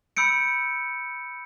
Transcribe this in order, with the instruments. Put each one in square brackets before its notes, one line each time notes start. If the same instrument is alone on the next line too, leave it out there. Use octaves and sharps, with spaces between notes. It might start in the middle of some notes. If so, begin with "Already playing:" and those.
[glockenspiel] B5 E6 G6 C#7 D7